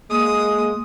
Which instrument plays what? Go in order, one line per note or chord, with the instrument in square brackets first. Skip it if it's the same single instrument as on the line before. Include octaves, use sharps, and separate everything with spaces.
[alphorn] G#3 [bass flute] A#3 [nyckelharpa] D#6